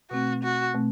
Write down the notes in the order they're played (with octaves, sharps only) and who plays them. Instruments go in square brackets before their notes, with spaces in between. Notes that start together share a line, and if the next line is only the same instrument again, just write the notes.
[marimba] B2 A3 C4 [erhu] F#4
[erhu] F#4
[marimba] B2 A3 C4